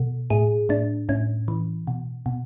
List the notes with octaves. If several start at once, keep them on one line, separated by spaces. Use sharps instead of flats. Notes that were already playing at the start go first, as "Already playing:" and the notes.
Already playing: B2 A4
A2 G#4
A2 D4
A2 C#4
E3
B2
B2